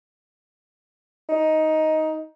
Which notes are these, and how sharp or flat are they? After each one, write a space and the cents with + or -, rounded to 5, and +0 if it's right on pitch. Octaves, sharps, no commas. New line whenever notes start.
D#4 +10